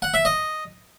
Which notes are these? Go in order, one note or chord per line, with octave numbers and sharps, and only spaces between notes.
F#5
E5
D#5